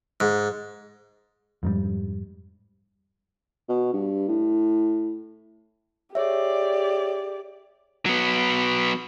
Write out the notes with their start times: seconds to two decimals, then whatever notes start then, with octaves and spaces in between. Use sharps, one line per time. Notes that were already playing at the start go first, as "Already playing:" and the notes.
0.20 G#2
1.63 F2 G#2 G3
3.69 B2
3.93 G2
4.28 A2
6.15 G4 G#4 C#5 D5 E5
8.06 F#3 B3